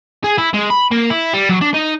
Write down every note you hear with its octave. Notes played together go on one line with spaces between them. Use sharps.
G#4
E4
G#3
B5
A#3
E4
G3
F#3
D4
D#4